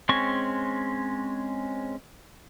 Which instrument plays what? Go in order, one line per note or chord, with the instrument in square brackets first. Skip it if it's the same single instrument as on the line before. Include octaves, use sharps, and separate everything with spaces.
[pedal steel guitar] G#3 C4 C#4 C#6